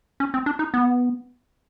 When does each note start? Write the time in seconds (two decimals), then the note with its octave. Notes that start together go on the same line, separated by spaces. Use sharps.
0.20 C#4
0.34 C4
0.46 D4
0.59 D#4
0.74 B3